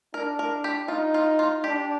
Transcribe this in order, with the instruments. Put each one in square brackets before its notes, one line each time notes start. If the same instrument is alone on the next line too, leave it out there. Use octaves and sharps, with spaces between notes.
[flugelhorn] D4 [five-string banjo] A#4
[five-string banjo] A#4
G4
[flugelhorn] D#4 [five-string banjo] F4
[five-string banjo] F4
F4
[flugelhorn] D4 [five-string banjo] G4